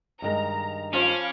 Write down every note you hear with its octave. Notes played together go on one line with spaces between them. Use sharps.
G2 D#3 G#3 A#5
F3 C#4 F4 F5 B5 D6